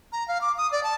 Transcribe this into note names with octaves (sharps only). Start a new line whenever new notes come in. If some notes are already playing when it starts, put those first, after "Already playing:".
A#5
F5
D6
D#6
D5
A5